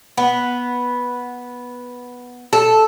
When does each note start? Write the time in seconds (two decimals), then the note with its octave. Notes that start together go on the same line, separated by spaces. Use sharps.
0.17 B3
2.53 A4